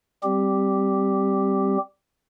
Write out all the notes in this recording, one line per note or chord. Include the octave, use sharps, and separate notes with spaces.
G3 C4 G4